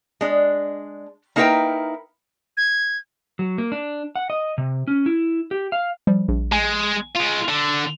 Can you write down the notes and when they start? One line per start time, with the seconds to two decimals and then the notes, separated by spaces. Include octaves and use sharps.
0.21 G#3 D4
1.36 A#3 D#4 E4 A#4 B4 G5
2.57 G#6
3.39 F#3
3.58 A#3
3.72 D4
4.16 F#5
4.30 D#5
4.58 C3
4.88 C#4
5.06 E4
5.51 G4
5.72 F5
6.07 F3 G3
6.28 A#1
6.52 G#3 G#5
7.15 G#3 F4
7.48 D3